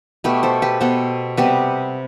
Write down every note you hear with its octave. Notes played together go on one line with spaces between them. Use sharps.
B2 A3 G4 B4
A4 C5
G4 B4
B2 B3 A4 C5
C3 G3 B3 G4 B4